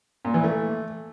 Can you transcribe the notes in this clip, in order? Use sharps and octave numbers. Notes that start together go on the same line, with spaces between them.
A#2
E3
A3